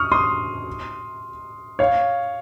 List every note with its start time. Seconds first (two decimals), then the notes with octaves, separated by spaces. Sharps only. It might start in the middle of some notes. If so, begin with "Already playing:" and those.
Already playing: C#6 D#6 F6
0.12 C6 D#6
1.79 C#5 F5